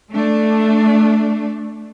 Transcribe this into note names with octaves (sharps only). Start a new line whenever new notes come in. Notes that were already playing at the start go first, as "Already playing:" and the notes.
A3 D4